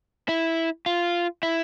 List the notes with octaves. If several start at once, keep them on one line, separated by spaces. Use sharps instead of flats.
E4
F4
E4